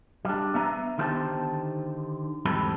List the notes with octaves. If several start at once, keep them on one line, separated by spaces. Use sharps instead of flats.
G3 D4
B3 E5 A#5
D3 D#3 E4 G4 C5 A5
E2 G#2 G3 C4 A4 B5